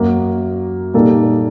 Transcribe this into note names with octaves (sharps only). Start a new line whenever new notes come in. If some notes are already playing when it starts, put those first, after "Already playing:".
Already playing: F#2 F#3 A#3 F#4
A#2 G3 A#3 D#4 A4